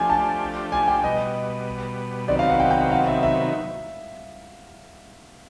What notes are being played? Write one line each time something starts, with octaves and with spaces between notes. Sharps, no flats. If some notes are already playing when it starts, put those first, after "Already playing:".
Already playing: F3 A3 D4 G4 G#5
A5
G#5
G5
B2 G3 B3 D#5
C3 D#3 F#3 B3 D5
F5
F#5
G5
G5
F#5
F5
E5
E5